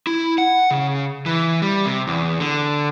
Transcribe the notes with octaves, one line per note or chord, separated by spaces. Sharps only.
E4
F#5
C#3
E3
G3
C3
E2
D3